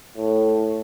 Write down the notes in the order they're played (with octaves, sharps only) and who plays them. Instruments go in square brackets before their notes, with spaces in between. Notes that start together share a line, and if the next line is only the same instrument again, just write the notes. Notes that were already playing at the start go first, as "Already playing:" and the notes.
[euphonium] A2